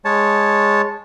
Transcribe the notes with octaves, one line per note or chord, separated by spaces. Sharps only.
G#3 C#5 A5